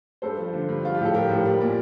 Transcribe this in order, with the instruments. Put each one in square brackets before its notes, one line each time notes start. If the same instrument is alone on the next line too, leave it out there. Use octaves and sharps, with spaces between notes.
[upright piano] G2 A4 C5
F3
D3
G2
F3 F4
A2 G4
A4
F3 G4 A#4
A2
G3
A#2